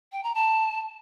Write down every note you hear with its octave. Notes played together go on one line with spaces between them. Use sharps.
G5
A#5
A5